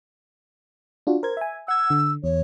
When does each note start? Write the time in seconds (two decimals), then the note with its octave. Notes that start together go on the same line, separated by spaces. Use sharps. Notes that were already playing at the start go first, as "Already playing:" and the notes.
1.07 D4 F4 F#4
1.23 A#4 C5 G#6
1.37 E5 G#5
1.68 F#5 E6 G#6
1.90 D3
2.24 E2 C#5